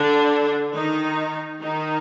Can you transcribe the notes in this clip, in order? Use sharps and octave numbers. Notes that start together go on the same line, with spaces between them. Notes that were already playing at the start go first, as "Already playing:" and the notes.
Already playing: D3 D4
D#3 D#4
D#3 D#4